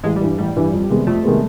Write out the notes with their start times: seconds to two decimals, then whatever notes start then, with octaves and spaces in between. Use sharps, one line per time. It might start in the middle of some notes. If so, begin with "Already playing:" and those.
0.04 A1 G#3
0.16 G3
0.21 G2 E3
0.38 A1 G3
0.56 G2 E3
0.73 F2
0.90 C3 D#3 G#3 B3
1.07 F2 A3
1.24 C3 D#3 G#3 B3